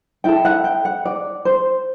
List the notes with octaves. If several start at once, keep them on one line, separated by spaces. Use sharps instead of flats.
E4 A4 G5
F#5
G5
F#5
D5
C5